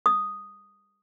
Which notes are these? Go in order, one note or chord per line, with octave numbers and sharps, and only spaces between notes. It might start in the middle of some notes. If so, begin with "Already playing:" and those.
D#6